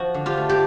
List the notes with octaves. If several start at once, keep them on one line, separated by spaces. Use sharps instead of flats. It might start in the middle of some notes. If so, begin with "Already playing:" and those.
Already playing: F3 F#4
D3
F4 G4
A3
G4